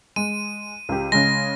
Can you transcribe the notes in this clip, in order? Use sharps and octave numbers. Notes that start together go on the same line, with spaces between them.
G#3 D#7
C#2 G4
C#3 G#3 A#6